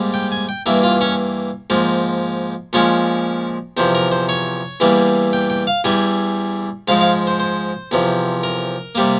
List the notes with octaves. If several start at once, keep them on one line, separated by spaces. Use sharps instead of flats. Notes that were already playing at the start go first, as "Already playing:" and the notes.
Already playing: G#2 G3 A#3
G5
G#5
G5
G2 E3 A#3 E5
F4
C#4
G#2 F3 A#3
A#2 F3 G#3 C#4
E2 C3 F3 C5
A#4
C5
C#5
E2 E3 G3 A#3
G5
G5
F5
E2 E3 G3 G#5
G#2 F3 G#3 F5
F5
C5
C5
E2 C3 F3
A#4
C3 G3 A#3